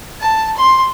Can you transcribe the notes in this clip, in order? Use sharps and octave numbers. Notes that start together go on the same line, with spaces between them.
A5
C6